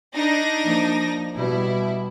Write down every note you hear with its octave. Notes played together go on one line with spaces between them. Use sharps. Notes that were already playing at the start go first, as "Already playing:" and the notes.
D4 D#4 A#6
F3 A#3
B2 G3 E4